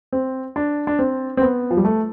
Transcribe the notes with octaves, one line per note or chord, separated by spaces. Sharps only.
C4
D4
D4
C4
C4
B3
F3
G3
A3